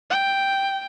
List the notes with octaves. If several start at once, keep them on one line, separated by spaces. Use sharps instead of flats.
G5